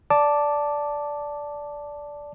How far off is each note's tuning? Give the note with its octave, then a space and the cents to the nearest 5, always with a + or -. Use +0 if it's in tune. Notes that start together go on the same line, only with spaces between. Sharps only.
D5 -10 A5 +0 D6 +0